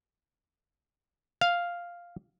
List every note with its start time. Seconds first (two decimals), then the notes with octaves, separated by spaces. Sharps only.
1.41 F5